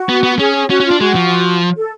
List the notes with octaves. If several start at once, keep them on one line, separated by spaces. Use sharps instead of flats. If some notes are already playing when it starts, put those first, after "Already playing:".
Already playing: F#4
B3
B3
C#4 G#4
C#4 F#4
C#4
D4 F4
G#3 F#4
F3
A4